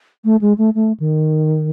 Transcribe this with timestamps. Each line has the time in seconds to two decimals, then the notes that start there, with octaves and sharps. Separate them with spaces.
0.24 A3
0.41 G#3
0.58 A3
0.75 A3
1.00 D#3